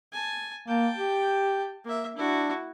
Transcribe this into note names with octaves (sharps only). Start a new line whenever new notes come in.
G#5 A5
A#3 G5 A5
G4
A#3 E5
D4 E4 F#4